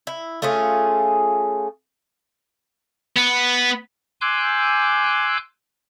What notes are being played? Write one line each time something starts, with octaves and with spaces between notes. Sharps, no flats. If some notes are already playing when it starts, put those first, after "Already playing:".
E4
A3 C#4 F4 G#4
B3
G#5 C6 D6 E6 F#6 G6